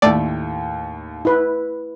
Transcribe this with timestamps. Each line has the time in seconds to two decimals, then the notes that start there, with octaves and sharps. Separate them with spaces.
0.02 D#2 A2 A3 D5 G5
1.25 E4 B4